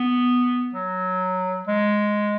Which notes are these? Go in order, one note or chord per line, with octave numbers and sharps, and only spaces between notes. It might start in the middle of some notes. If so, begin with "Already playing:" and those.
Already playing: B3
F#3
G#3